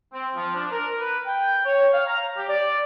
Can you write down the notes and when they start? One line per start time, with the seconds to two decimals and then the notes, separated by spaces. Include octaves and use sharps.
0.13 C4
0.36 F3
0.56 D4
0.72 A#4
0.99 B4
1.26 G5
1.66 C#5
1.93 F5
2.07 A#5
2.37 G4
2.48 D5